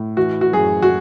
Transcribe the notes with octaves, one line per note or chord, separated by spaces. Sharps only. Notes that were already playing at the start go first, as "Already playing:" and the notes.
Already playing: A2
E3 F#4
F#4
F#2 G#4
F#4